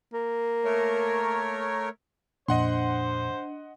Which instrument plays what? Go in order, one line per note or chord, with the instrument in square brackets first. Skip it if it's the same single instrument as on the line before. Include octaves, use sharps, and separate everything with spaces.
[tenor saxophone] A#3
[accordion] A3 A#4 C#5
[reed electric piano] F2 A#2 [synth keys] D4 [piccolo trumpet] C5 [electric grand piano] D#5 F#5 C6